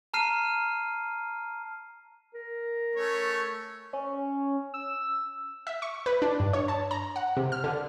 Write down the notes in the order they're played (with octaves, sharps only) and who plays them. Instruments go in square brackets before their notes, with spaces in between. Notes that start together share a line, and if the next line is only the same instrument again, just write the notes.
[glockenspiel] A5 A#5 F6 C7 D#7
[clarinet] A#4
[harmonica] A3 C#4 C#5
[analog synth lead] C#4
E6
[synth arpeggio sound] E5
C#6
B4
D4
G2
C#5
A5
A#5
F#5
C3
F6
D3